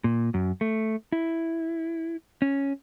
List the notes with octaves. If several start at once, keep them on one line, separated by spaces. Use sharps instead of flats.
A#2
F#2
A3
E4
C#4